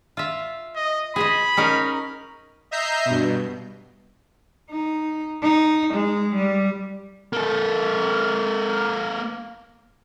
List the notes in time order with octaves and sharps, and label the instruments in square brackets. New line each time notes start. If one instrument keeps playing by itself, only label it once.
[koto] F4 E5
[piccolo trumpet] D#5
[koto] G#4 C5 D#5 [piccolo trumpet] B5
[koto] C#4 D#4 A#4
[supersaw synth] D#5 E5 A#5 G6 C7
G2 B2
[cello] D#4
D#4
G#3
G3
[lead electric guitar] A#3 A4